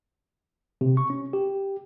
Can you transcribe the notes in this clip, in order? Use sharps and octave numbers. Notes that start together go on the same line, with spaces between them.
C3
C#6
C#4
G4